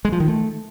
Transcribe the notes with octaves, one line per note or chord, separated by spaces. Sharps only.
G#3
F3
D#3
A3